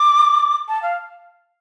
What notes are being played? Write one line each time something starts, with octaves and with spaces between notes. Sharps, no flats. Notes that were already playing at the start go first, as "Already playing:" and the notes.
Already playing: D6
A5
F5